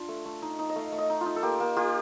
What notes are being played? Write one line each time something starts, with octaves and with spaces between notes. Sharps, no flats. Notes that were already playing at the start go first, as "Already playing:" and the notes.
Already playing: D4 F4
A3
A3
D#4
D#4
D#5
A3 F5
A3
D#5
D#4
F4
D#4
A4
A#3 G4
A#3
F4 G4